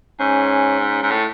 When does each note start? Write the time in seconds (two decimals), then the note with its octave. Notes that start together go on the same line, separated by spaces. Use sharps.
0.20 G#2 C#4
0.81 C#4
1.03 G#2
1.11 A2